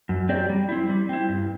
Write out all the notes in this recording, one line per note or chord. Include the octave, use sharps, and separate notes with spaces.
F#2
F#3 C4 G4 D5
G3
C4 E4
G3
C4 E4
G2